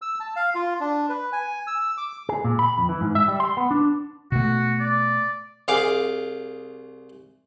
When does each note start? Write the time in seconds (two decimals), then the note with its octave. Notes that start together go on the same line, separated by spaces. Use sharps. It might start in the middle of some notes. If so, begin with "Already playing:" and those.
0.02 E6
0.20 A5
0.36 F5
0.55 F4
0.80 D4
1.09 B4
1.33 G#5
1.67 E6
1.97 D6
2.29 G#4
2.44 A#2
2.59 B5
2.78 F2
2.89 E3
3.01 G#2
3.15 E5
3.28 G3
3.40 C6
3.57 B3
3.71 D4
4.32 B2 A3 F#4
4.80 D5
5.68 C2 G#4 F5 D6